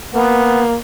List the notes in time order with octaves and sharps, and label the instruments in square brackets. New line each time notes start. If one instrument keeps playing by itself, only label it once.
[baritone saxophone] A#3 [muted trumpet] B3